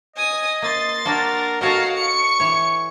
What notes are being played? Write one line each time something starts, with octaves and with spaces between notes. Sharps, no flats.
D#5 G#5 D#6
A#3 C6 A6
A#3 D4 F#4 A#4
F#4 A4 A#4 C#5 D#5 F5
C#6 C#7
E3 C#5